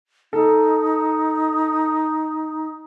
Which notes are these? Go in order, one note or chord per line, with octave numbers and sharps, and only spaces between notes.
D#4 A4